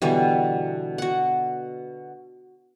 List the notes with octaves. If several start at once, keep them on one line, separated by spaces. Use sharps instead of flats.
B2 D3 E3 G3
F#4 F#5